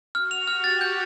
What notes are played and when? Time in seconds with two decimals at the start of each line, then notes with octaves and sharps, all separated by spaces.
0.15 F#4 F6
0.31 F7
0.47 G4 F6
0.64 A6
0.81 G6